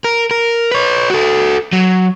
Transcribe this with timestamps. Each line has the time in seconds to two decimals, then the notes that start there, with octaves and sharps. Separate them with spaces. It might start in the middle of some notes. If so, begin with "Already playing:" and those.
0.04 A#4
0.31 A#4
0.72 B4 C#5
1.10 F#4 A4
1.72 F#3